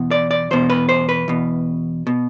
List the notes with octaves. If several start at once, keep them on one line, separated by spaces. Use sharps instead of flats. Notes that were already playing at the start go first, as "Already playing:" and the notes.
Already playing: E2 B2
D5
D5
E2 B2 C5
B4
C5
B4
E2 B2
B2